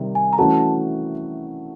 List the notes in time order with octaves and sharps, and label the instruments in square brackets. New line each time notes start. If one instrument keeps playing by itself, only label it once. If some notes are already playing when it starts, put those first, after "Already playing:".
Already playing: [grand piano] C3 D#3 G3
[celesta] G#5
A#5
[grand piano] E3 A3 C#4 F#4 A4 [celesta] A5